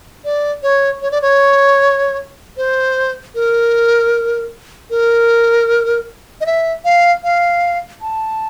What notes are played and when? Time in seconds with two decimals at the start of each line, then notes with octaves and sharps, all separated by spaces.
0.25 D5
0.63 C#5
1.02 C#5
1.11 D5
1.22 C#5
2.57 C5
3.35 A#4
4.90 A#4
6.41 D#5
6.46 E5
6.85 F5
7.24 F5
8.01 A5